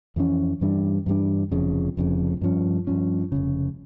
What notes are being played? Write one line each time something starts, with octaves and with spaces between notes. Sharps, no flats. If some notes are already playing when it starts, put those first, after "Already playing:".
F2 E3 A#3 C#4
G2 E3 G3 D4
G2 E3 G3 D4
F1 F2 C#3
F1 F2 C#3
G2 F3 C#4
G2 F3 C#4
F1 E2 C#3